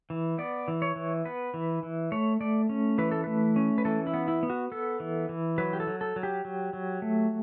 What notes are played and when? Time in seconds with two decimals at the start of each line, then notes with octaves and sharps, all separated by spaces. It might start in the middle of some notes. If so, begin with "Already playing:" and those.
0.10 E3
0.38 B3 D5
0.68 E3
0.82 C#5
0.96 E3
1.25 B3 B4
1.54 E3
1.83 E3
2.12 A3 C#5
2.40 A3 D5
2.69 C#4
2.98 E3 B4
3.11 A4
3.24 A3 B4
3.56 C#4
3.78 B4
3.85 E3 A4
4.07 E4
4.14 B3
4.28 E4
4.43 B3
4.50 F#4
4.72 B3 A4
5.00 E3
5.29 E3
5.58 F#3 B4
5.73 G4
5.80 A4
5.87 F#3
6.01 A4
6.16 F#3
6.23 G4
6.45 F#3
6.73 F#3
7.02 A3